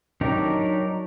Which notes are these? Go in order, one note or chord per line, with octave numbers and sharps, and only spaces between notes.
F#3 D4 D#4 G4 A#4